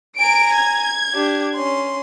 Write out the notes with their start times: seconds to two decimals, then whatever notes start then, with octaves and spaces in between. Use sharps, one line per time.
0.18 G#5 A#5 D7
0.55 G#6
1.14 D4 G4
1.55 C#4 C6